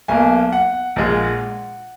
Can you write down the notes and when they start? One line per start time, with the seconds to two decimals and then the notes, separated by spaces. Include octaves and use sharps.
0.08 B1 B2 A#3 G#5
0.53 F#5
0.96 A#1 A#2 G#3